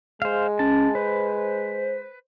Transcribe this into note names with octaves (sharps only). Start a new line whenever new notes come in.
G#3 C5 F5
C#4 A5
B4 C5